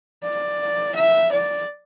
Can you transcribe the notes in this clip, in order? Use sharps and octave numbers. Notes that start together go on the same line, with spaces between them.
D5
E5
D5